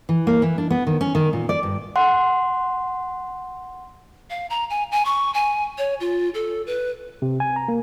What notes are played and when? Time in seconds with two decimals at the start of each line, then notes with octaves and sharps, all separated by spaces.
0.09 E3
0.27 A#3
0.42 E3
0.58 D4
0.70 B3
0.87 D#3
1.01 C#4
1.15 D#3
1.33 A#2
1.49 D5
1.63 G2
1.96 F#5 C6
4.30 F5
4.50 A#5
4.70 G#5
4.92 G#5
5.05 C#6
5.34 G#5
5.78 C#5
6.00 F4
6.34 A4
6.67 B4
7.22 C3
7.40 G#5
7.56 A#5
7.68 A#3